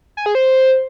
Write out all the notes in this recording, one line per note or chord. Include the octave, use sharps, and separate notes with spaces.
G#5
G#4
C5